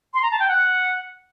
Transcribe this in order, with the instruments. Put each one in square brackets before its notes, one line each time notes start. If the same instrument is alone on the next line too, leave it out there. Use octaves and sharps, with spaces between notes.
[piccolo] C6
A#5
A5
G5
F#5